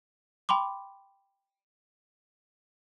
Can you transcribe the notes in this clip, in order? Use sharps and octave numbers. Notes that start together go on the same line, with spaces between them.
G5 B5 C6 D6